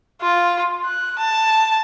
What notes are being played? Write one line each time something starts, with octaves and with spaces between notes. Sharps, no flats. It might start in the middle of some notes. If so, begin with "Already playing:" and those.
F4
F#6
A5